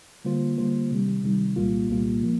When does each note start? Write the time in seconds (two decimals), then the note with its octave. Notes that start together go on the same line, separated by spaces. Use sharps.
0.25 D3 G3 A#3 F4 C5
0.57 D3 G3 A#3 F4 C5
0.91 C3 D#3 G3
1.24 C3 D#3 G3
1.56 C2 A#2 G3 A#3 F4
1.89 C2 A#2 G3 A#3 F4
2.23 F3 A#3